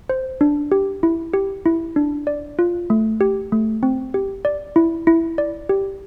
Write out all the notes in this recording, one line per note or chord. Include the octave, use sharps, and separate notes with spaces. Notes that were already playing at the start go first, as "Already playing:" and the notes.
C5
D4
G4
E4
G4
E4
D4
D5
F4
A3
G4
A3
C4
G4
D5
E4
E4
D5
G4